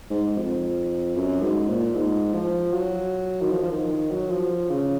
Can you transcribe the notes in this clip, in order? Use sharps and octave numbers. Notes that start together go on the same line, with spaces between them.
G#2
F2
F#2
G#2
A#2
G#2
F3
F#3
D#3
F3
F3
D#3
D#3
F#3
F3
C#3